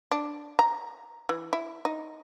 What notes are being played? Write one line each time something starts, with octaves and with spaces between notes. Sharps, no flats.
D4
A#5
E3
E4
D#4